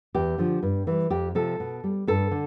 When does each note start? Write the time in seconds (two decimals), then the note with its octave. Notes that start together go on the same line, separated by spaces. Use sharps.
0.15 E2 G4
0.38 D3 F3
0.62 G2
0.87 E3 G3
1.10 F2 G4
1.35 C3 F3 A4
1.60 B2
1.84 G3
2.07 G2 A4
2.31 D3